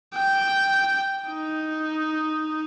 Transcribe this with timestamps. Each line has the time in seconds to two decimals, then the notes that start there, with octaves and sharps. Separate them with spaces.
0.15 G5
1.29 D#4